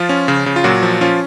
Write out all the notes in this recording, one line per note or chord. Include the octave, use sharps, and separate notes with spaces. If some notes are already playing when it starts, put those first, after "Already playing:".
Already playing: F3 F4
C#4
C#3
C#3
F4
A#2 F#3 F#4
F3
F3 C#4 F4